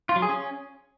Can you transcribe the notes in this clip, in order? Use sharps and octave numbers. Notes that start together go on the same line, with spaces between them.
F4
F#3
G#4
C#4